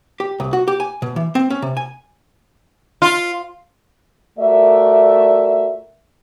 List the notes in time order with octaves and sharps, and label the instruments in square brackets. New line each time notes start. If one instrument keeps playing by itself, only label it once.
[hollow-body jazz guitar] G4
C2
F#4
G4
G#5
B2
E3
C4
C#4
C3
G#5
[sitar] F4
[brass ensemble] A3 F4 F#4 A#4 D5 E5